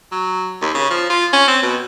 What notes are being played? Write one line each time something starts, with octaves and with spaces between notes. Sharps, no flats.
F#3
D#2
C#3
F3
F4
C#4
C4
B2